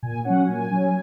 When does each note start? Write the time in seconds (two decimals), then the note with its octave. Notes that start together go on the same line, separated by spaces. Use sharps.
0.02 A#2 G#5
0.25 F#3 C#4 F#5
0.47 A#2 G#5
0.70 F#3 C#4